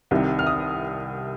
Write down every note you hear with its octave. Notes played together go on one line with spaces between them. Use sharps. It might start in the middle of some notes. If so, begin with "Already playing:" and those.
C2 C3 D#3
F6
D#6